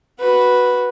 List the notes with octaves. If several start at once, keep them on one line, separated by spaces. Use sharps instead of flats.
F#4 B4